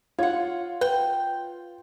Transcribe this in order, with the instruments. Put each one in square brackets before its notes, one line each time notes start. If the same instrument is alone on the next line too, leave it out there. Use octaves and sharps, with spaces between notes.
[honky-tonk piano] F4 [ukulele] C#5 F#5
[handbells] B4 [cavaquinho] G5